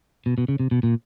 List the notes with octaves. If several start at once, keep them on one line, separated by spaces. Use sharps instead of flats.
B2
B2
C#3
C3
B2
A#2